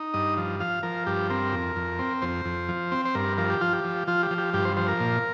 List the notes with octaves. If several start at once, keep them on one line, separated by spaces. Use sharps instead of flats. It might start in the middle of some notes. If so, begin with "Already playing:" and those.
Already playing: D#4
G2 D#5
F3
F3 F5
F3 A#4
G2 G4
C4 A#4
F2
F2
C4
F2 C5
F2
F3
C4
C5
G2 A#4
F3 A#4
G4
F3 F4
G4
F3
F3 F4
G4
F3
G4
G2 G4
C5
F3 C5
A#4
A#2